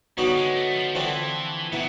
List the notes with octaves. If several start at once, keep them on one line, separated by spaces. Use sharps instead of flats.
D3 F#3 G3 B3 D#4 F#4
G#3
A3
F3
D3 E3 F3 A3 C4
A#2 B3 E4